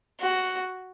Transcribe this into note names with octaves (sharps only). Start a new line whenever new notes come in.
F#4